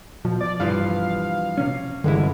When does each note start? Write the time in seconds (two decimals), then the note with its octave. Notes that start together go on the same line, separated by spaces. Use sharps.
0.25 B2 F3
0.41 D5
0.60 G2 E3 F3 F5
1.58 C3 C#4
2.04 G1 D3 E3 G#3 E4